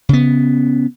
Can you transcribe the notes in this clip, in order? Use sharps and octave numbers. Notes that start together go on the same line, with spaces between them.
C#3 B3